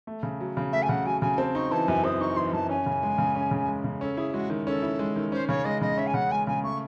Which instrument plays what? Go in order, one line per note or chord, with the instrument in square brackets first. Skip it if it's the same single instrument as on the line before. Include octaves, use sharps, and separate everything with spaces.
[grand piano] A3
C#3
F#3
C#3
[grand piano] A3 [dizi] E5
[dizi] G#5
[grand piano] C#3 [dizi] F#5
[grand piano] F#3 [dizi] G#5
[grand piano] C#3 [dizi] G#5
[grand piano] C4 [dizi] A5
[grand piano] D#4 [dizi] C#6
[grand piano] E3 [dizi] A5
[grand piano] F#2 [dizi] G#5
[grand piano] C4 [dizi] D#6
[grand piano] D#4 [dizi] C#6
[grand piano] E3 [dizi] C6
[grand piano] F#2 [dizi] A5
[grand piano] C#4 [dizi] G#5
[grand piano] C#3
G#3
C#3
C#4
C#3
G#3
C#3
[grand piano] C#4 [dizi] A4
[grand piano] E4 [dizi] G#4
[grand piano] G#3 [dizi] F#4
[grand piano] D#3
[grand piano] C#4 [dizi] A4
[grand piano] E4
G#3
D#3
[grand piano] C#4 [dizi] C5
[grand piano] C#3 [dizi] C#5
[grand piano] G#3 [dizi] D#5
[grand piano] C#3 [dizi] D#5
[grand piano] C#4 [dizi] E5
[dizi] G#5
[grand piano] C#3 [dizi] F#5
[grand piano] G#3 [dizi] G#5
[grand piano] C#3 [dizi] G#5
[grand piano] A3 [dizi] C#6